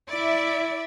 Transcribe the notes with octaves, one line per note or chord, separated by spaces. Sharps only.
E4 D5 E5